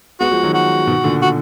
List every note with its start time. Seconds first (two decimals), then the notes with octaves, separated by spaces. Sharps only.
0.20 G#3 B3 F#4
0.31 F3 G#3
0.43 D#3 F#3
0.54 F#4
0.87 B2 D#3
1.04 A#2 D3
1.22 F#4